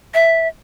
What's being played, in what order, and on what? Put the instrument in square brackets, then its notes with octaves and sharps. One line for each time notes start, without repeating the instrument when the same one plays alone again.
[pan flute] E5